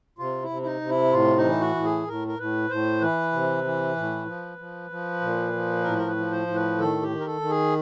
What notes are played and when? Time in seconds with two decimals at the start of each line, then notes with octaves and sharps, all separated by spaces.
0.19 C3 F4
0.42 E4
0.50 C3
0.62 E4
0.65 D#4
0.81 C3
0.89 E4
1.13 A2 F4
1.37 D#4
1.44 E3
1.60 F#4
1.75 A2
1.84 G#4
2.07 A2 A#4
2.27 A#4
2.39 A2 B4
2.70 A2 C5
3.01 E3 B4
3.33 C3
3.64 E3
3.96 A2
4.27 F3
4.58 F3
4.90 F3
5.21 A#2
5.53 F3
5.84 A2 A#4
5.98 A#4
6.07 B4
6.16 F3
6.32 C5
6.47 A2
6.56 B4
6.78 D#3 A4
7.02 G4
7.10 D#3
7.20 A#4
7.26 A4
7.41 D#3
7.49 G#4